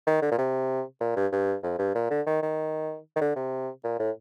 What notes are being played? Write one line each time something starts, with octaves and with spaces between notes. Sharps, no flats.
D#3
D3
A#2
C3
A#2
G2
G2
F2
G2
A#2
D3
D#3
D#3
D#3
D3
C3
A#2
A2